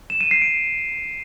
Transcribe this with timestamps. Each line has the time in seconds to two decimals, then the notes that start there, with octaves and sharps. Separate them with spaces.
0.10 E7
0.21 D#7
0.31 C7
0.42 D7